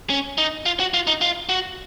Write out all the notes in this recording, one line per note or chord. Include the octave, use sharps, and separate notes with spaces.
C#4
D#4
F4
F#4
F4
D#4
F4
F#4